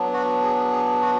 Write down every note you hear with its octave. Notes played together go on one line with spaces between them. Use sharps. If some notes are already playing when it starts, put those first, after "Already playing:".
Already playing: F#3 B3 D4
F#4
G#4
G#4
F#4